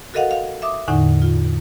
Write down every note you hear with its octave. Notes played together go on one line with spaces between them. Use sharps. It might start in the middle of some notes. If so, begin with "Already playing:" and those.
F#4 A4 A#4 D#5 F5 F#5
F5
E5 D6 D#6
E2 A2 D3 D#4 F#5
F4